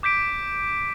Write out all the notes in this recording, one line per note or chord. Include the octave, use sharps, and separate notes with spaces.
D6 G6 B6 D7